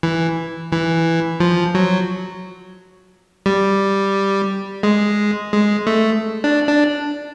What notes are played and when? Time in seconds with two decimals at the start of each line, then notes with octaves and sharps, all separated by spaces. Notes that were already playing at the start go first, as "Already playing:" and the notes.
0.03 E3
0.72 E3
1.40 F3
1.75 F#3
3.46 G3
4.83 G#3
5.53 G#3
5.87 A3
6.44 D4
6.67 D4